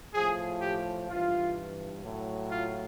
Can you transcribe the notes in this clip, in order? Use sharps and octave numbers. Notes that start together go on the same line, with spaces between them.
A2 F3 G#4
G4
G2 E3 F4
A2 F#3
F4